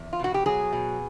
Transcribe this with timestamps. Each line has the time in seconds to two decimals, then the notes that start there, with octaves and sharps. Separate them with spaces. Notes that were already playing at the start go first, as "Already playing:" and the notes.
Already playing: E2
0.13 F4
0.19 B2 F#4
0.34 G4
0.46 F#3 G#4
0.73 B2